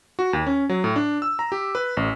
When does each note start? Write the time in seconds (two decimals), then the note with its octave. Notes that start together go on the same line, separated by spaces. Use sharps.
0.19 F#4
0.33 D#2
0.47 C#4
0.69 F#3
0.84 A2
0.96 D4
1.22 E6
1.39 A#5
1.52 G4
1.75 B4
1.97 A1